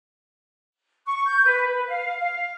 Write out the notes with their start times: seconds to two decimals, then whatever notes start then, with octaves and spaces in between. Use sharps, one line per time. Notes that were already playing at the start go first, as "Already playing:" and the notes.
1.07 C#6
1.25 G6
1.45 B4
1.72 B4
1.88 F5
2.20 F5